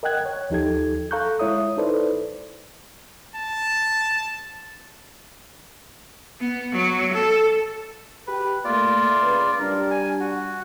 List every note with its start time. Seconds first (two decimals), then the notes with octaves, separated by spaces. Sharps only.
0.03 A#4 D#5 F#5 G5 F#6 G#6
0.25 C#5
0.50 D#2 F3 D#4 G4 A4 G#6
1.11 A4 F5 A#5 C#6 F#6 G6
1.39 G#3 E4 C#5 E5 D#6
1.77 D#4 E4 A4 B4 C5 D5
3.36 A5
6.40 B3
6.73 F#3
7.14 A4
8.27 G4 B4
8.65 A3 A#3 F4 D5
9.23 C#3 B4
9.59 G3 D4 A#4
9.91 G#5
10.20 F#4